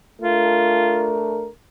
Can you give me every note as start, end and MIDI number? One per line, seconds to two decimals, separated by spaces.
0.21 1.47 57
0.21 1.47 62
0.21 1.18 65
0.21 1.47 70